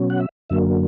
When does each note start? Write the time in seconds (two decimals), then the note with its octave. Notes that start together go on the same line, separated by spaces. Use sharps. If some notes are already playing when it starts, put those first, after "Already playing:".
Already playing: B2 F#3 C#4
0.10 F#5
0.20 E5
0.50 F#2 D3 F#3 A#3 E5